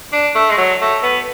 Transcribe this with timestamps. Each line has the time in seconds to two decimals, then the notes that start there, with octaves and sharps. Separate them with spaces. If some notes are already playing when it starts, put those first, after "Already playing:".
0.13 D4
0.35 A3
0.51 G#3
0.58 F#3
0.81 A3
1.03 B3